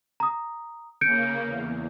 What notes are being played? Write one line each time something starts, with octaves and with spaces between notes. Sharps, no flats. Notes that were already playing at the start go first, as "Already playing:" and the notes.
A#5 D#6
C#3 A#3 G6 C#7 D7
E2